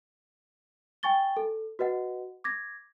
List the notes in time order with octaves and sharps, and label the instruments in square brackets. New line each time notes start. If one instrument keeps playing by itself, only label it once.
[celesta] G5 G#5 C#6 A6 G7
A4
F#4 B4 D#5 F#5
D6 G#6 A#6